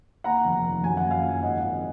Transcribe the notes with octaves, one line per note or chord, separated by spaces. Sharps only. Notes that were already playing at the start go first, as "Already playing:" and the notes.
D#2 F#5 A#5
F1
D#3
F#2 G#5
F#5
F#1
F5 G#5
F3
G#2 D#5 F#5
G#1